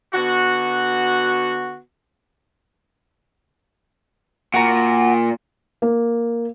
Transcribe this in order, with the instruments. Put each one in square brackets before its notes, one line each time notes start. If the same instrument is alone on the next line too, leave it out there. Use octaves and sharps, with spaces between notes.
[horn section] D3 B3 F#4
[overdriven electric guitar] A#2 [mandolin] F#4 A#5
[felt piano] A#3